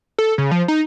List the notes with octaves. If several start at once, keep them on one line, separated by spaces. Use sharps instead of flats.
A4
C#3
F3
D#4